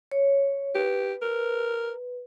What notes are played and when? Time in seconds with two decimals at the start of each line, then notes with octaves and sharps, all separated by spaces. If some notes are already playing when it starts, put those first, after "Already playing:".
0.12 C#5
0.75 G4 B4
1.22 A#4